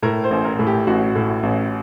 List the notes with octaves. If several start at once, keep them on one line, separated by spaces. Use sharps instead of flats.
A2 A#4
C5
A1
A#4
A2
G4
A1 F#4
A2
A1